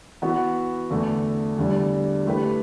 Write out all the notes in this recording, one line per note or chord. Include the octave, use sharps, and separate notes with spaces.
E3 B3 F#4
E2 D3 A3
E2 D3 G3 D4
E3 A3 E4 G4 B4